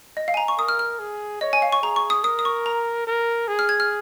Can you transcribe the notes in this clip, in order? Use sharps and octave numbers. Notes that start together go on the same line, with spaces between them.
D#5
F5
G#5
A#5
C#6
A#4 D#6
F6
F6
G#4
C#5 D#5
G#5
F5
C#6
G#4 A#5
C#6
D#6
A#4 D#6
D#6
C#6
A#5
A#4
G#4
F6
G#6
F6